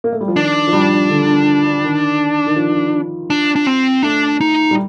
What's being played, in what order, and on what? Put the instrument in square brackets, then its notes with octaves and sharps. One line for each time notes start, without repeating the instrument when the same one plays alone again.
[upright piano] A#3
A3
G3
F3
[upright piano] D#3 [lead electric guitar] D4
[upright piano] F3
G3
D3
D#3
D#3
F3
[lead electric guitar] D4
D4
C4
[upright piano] A3 [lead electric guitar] D4
[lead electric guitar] D#4
[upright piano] G3